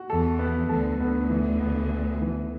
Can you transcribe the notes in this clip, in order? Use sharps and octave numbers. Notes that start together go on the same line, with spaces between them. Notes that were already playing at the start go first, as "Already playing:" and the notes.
Already playing: F#4
E2 E3 A4
B3
D2 D3 A4
D2 D3 B3
E3
B3
B3
E3